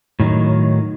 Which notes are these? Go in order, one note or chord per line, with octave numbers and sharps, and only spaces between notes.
A2 D#3 F#3